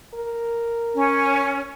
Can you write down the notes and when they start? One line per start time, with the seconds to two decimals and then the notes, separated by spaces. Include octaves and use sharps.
0.14 A#4
0.94 C#4